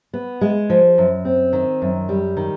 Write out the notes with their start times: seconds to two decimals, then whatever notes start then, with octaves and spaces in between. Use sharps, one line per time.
0.13 B3
0.41 G#3
0.70 F3
0.98 F#2
1.25 C4
1.53 D#3
1.82 F#2
2.09 G3
2.37 D#3